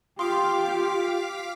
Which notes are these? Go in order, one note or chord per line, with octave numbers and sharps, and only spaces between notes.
F4 G4 F5 C6 D6 D#6 B6